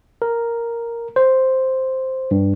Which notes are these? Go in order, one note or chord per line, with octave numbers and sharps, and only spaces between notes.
A#4
C5
G2